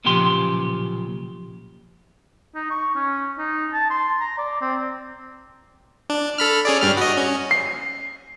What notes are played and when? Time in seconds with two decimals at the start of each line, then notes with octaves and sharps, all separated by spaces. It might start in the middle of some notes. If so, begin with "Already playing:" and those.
0.04 B1 A#2 C#3 F3 G4 C6
2.55 D#4
2.71 C#6
2.95 C#4
3.38 D#4
3.73 A5
3.90 C6
4.20 A#5
4.38 D5
4.62 C4
6.10 D4
6.38 A4 B5 F6
6.65 C#4 G#4 D5
6.81 G2 G3 F6
6.97 F#4 D#5
7.17 C#4
7.51 C7